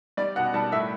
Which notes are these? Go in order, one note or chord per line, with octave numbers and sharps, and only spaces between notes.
G3 D5
B2 F#5
G3 A5
A2 E5